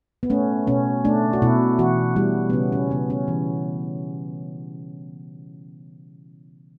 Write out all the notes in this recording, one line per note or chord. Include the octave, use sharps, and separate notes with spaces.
B3
A3 C#4
B2 C#4
A3 D4
F#4
B2 E4
E3 F#4
G3 E4
B3
C#3 C#4
C#4
C#3 B3
C#4
E3